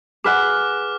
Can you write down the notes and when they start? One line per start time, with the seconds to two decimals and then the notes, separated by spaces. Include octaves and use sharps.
0.24 G#4 B4 F#5 D6 F6